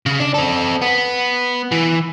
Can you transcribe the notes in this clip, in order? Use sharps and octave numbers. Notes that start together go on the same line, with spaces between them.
C#3
D4 D5
C4 A4
B3
E3